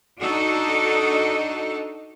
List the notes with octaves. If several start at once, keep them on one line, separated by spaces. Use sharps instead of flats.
D4 D#4 F#4 A4